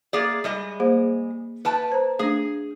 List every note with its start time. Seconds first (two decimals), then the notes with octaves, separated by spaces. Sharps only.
0.13 A#3 G#4 D5
0.44 G3 G#3 D#5
0.80 A#3 G#4 C5
1.65 B4 G5 A5
1.92 C5 A#5
2.19 A3 D4 G#4